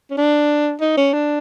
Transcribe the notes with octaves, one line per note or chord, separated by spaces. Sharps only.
C#4
D4
D#4
C#4
D4